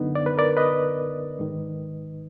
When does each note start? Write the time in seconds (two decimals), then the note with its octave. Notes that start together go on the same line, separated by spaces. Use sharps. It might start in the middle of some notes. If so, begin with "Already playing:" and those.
Already playing: F#2 D3 B3 D#4
0.15 D5
0.26 B4
0.37 A#4 D5
0.57 B4 D#5
1.39 G#2 D#3